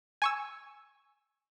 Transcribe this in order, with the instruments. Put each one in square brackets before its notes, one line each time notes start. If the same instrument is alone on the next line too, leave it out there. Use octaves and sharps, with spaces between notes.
[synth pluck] G#5 C#6 E6